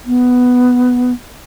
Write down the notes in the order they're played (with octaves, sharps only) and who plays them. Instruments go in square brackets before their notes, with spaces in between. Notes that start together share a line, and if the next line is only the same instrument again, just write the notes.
[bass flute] B3